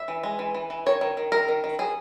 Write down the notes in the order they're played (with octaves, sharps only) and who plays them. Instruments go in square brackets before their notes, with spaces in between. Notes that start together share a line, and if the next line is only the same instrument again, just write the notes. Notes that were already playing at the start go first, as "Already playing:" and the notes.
Already playing: [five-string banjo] E5
E3
G#3
E3
E3
E3
D#3 C#5
D#3
D#3
D#3 A#4
D#3
D#3
F#3 G#4